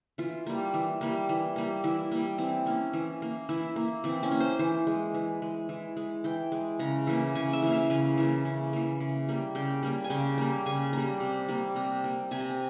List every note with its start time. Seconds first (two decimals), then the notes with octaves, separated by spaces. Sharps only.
0.18 E3 F4
0.47 G3 A#3
0.74 E3
1.01 G3 A#3
1.29 E3
1.56 G3 A#3
1.84 E3 E4
2.11 G3 A#3
2.38 E3 C4
2.66 A#3 C#4
2.93 E3
3.22 A#3
3.49 E3 E4
3.76 A#3
4.04 E3 C4
4.23 C#4
4.31 A#3
4.40 C5
4.59 E3 C5
4.87 G#3
5.14 E3
5.42 G#3
5.69 E3
5.97 G#3
6.24 E3 G5
6.52 G#3
6.79 C#3 A#5
7.07 E3 A#3
7.35 C#3 G#5
7.53 E5
7.62 E3 A#3
7.72 F5
7.90 C#3 G#5
8.18 E3 A#3
8.45 C#3
8.73 E3 A#3
9.00 C#3
9.28 G3 A#3
9.55 C#3 G5
9.83 G3 A#3
10.04 G#5
10.10 C#3 G5
10.38 G3 A#3
10.66 C#3 G#5
10.93 G3 A#3 A#5
11.20 C3
11.48 G3 A#3
11.75 C3 A#5
12.04 G3 A#3
12.31 C3 G#5
12.41 A#5
12.50 G#5